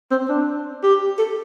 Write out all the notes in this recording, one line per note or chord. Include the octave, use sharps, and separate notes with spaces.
C4
D4
G4
A4